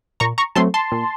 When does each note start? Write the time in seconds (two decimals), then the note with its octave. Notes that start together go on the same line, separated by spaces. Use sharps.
0.20 A#2 A#5 C#6
0.38 A#5 C#6
0.55 F#3 A3 C4 A5 C6
0.74 A5 C6
0.92 A#2